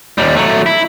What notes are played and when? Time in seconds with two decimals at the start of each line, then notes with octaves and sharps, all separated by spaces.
0.18 D#2 G3
0.36 F#3 A3
0.66 E4